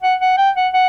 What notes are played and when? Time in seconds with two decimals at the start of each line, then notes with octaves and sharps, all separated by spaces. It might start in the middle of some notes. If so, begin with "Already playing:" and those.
0.02 F#5
0.20 F#5
0.38 G5
0.56 F#5
0.73 F#5